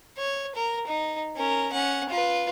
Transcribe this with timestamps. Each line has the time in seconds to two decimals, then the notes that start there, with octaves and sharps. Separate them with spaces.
0.18 C#5
0.55 A#4
0.87 D#4
1.36 C#4 A#4
1.72 C#4 F#5
2.09 F4 B4